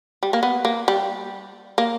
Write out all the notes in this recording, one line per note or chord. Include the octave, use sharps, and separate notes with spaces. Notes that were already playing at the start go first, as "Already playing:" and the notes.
G3
A#3
B3
A#3
G3
A#3